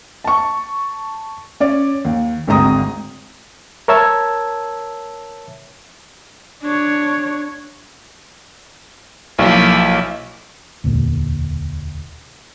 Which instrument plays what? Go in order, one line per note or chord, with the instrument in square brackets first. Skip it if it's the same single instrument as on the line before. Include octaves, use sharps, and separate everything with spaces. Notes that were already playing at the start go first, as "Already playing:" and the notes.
[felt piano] A5 C#6
C#4 D5
D#2
G#1 D2 G#3 C4 A#5 D#6
[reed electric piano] A#4 C#5 E5 A5 E6 G#6
[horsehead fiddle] D4 C#5
[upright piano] B1 [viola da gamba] F3 A#3 E4
[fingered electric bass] E1 D2 A#2